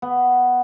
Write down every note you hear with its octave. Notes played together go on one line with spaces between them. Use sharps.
B3